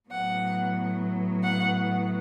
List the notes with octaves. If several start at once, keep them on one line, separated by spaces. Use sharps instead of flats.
A2 F#3 B3 F#5
F#5